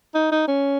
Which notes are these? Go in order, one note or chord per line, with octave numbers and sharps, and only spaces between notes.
D#4
D#4
C#4